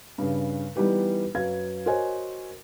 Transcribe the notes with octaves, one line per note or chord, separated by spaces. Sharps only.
G2 C#3
E3 G3 B3 D#4 G4 B4
F#2 B4 F5 G#6
F#4 A#4 C5 C#5 D#5 G#5